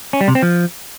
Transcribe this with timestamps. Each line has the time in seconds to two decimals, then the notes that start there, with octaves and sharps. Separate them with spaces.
0.13 C#4
0.21 G3
0.28 C3
0.35 C4
0.43 F3